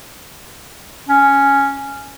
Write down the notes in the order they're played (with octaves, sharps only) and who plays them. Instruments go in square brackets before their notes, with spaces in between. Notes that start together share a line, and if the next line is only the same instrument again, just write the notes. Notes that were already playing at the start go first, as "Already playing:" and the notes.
[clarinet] C#4